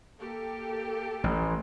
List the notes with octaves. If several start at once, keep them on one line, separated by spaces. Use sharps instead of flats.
A#3 G4 A4
A1